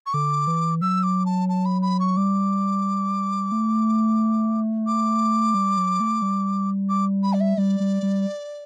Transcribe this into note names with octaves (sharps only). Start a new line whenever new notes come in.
C#6
D3 D6
E3
F#3 E6
D6
A5
A5
B5
B5
C#6
G3 D6
A3
D6
G3
F#3
A3
G3
D6
B5
D5
E5
G3 D5
G3
G3